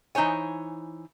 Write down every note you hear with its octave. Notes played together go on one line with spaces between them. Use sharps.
E3 D#4 C5 C#5 G#5